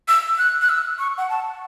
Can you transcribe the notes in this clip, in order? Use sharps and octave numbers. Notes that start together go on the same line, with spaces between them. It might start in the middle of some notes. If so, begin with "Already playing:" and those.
E6
F#6
F#6
E6
C#6
F#5
A5